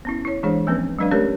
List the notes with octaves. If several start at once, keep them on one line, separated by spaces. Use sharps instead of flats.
B3 C#4 E4
E4 C#5
E3 G#3 D4 G#4 C5 C#5
F3 A#3 C4 C#4 B4
F#3 G#3 D4 B4 D5 F5
A3 C#4 G4 A#4 B4 C#5